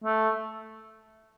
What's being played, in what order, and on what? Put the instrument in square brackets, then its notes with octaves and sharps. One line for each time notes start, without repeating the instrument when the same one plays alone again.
[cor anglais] A3